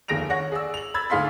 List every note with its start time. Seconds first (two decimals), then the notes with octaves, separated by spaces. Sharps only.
0.08 F1 D#2 G#4 A#6 D7 F7
0.30 C#5 F#5 A#6
0.52 G#4 D5 E6
0.74 F7 F#7
0.94 B5 E6 G#6 A6
1.10 D2 G#2 G#4 F5 C6 B6